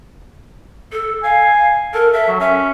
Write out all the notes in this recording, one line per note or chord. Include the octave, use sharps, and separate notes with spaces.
A4
F5 G#5
A4 A#4
A4 E5
F#3
C#4 E5